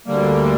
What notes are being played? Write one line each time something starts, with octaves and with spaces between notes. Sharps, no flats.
D2 D3 G3 A#3